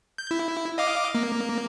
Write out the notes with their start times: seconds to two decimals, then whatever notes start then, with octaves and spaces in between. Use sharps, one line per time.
0.18 G6
0.31 E4
0.78 D#5 F5 D6
1.15 A#3